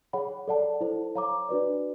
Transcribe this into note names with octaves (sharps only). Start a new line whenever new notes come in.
G#4 C#5 F#5 B5
A4 D5 F#5 A5
E4 A4 C5
C#5 F5 A#5 D6
D4 F#4 B4 D5